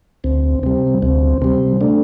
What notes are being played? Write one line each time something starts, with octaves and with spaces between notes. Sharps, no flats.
D2 C4
C3 G3 C4
D2 C4
C3 G3 C4
A3 D4